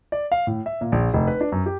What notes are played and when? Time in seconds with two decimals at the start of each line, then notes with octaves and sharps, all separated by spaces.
0.12 D5
0.32 F5
0.47 A2
0.66 E5
0.81 A#2
0.92 A#1
1.14 F1
1.28 B4
1.41 D4
1.52 F#2
1.66 G4